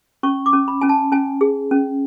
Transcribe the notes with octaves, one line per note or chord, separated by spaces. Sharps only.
C#4 C#6
D6
C#4
B5
C#4 G#5
A5
C#4 G#5
G#4
C#4